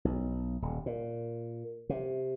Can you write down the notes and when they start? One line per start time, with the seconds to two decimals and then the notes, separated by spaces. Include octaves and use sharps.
0.05 B1
0.62 D#1
0.86 A#2
1.89 C3